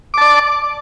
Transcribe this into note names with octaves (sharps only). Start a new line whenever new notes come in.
D5 A5 D6